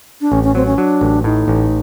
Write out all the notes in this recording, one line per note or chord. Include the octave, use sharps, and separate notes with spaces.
D4
A1 C#4
C#4
F#3 C4
C#4
F#3 D4
A1
A2 D#4
A1